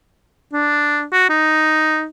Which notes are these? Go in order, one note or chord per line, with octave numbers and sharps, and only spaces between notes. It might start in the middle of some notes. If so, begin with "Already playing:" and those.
D4
F#4
D#4